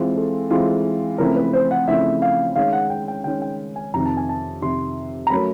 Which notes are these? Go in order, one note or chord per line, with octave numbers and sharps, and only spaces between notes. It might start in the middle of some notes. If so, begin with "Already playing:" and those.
Already playing: E3 G#3 C4 F4
A4
E3 G#3 C4 F4
C#3 F3 A3 C4 E4 A#4
B4
C5
F#5
C#3 F3 A3 C4 E4 E5
F5
D#3 G#3 C#4 F5
F#5
G5
G5
D#3 G#3 C#4 G5
G5
G#5
F2 C3 D#3 A#5
A5
G#5
A5
F2 C3 D#3 C6
A#5
F#3 A3 C#4 F#4 A#4 B5